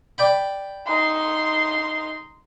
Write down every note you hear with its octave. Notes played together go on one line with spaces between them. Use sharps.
D5 G5 B5
D#4 C6